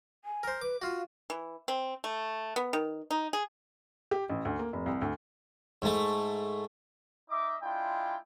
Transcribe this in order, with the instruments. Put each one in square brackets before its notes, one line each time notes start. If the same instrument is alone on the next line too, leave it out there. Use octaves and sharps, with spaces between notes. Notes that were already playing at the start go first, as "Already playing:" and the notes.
[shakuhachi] G#5
[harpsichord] A#4 C5
[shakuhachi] B4 [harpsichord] D6
[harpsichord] F4 F#4 [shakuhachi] F5
[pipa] E3
C4
A3
B3
D#3
D#4
G#4
[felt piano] G4
A1
D2
A#3
F1
C2
D2
[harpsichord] G#2 A3
[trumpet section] D#4 D#5 E5 D6
G#3 D4 E4 F4 G5